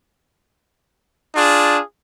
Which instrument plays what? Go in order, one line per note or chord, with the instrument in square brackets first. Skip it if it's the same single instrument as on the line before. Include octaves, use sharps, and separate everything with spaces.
[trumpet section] D4 F4 G#4